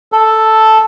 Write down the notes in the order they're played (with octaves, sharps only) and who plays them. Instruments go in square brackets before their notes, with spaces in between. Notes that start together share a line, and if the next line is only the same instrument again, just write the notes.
[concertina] A4